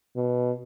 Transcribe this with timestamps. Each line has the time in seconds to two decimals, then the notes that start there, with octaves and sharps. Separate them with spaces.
0.16 B2